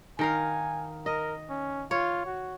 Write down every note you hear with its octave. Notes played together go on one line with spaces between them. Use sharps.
D#3 A#4 F5 G#5
A#4 D#5
C#4
F4 C#5
F#4